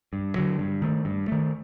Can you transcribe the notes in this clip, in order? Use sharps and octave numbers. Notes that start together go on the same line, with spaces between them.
G2
D3 F#3
G2
D#3 A3
G2
D#3 A3